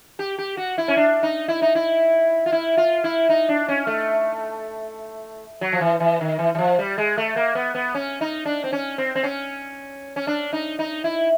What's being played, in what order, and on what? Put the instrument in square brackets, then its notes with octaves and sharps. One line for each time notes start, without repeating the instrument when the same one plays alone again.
[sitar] G4
G4
F#4
E4
C#4
D4
D#4
E4
D#4
E4
F4
E4
F4
E4
D#4
D4
C#4
A3
F#3
F3
E3
E3
D#3
E3
E3
F3
G3
G#3
A3
A#3
B3
B3
C#4
D#4
D4
C4
C#4
C4
C4
C#4
C#4
D4
D#4
D#4
E4